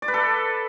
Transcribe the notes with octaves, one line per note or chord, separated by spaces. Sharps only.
D5
B4
A4